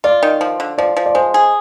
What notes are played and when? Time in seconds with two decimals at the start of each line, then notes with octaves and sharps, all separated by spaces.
0.04 F4 D5
0.23 D#3
0.41 F3
0.60 D3
0.78 F3 D5
0.97 F3
1.06 D5
1.15 G#3 C5
1.34 G#4